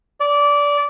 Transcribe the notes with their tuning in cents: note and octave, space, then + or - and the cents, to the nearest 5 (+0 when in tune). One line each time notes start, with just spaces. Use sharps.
D5 -20